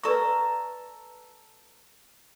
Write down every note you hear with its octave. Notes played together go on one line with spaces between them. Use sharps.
A4 B4 D5 A#5 C#6